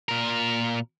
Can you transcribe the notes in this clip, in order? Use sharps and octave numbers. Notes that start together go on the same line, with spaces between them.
A#2 A#4